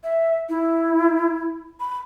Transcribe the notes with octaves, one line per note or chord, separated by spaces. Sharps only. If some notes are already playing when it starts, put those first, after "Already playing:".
E5
E4
B5